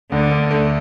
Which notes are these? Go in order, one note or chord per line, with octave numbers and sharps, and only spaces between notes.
D2 D3
D2
A3